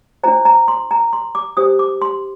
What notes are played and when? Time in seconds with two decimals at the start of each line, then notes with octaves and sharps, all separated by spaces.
0.23 D4 F4 C5 A#5
0.45 A#5
0.68 C6
0.91 A#5
1.13 C6
1.35 D6
1.57 D4 G4 C5 D#6
1.79 D6
2.02 C6